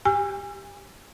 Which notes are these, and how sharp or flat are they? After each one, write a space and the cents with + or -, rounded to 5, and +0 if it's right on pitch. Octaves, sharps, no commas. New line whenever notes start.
G4 +0 G#5 -30 E6 +35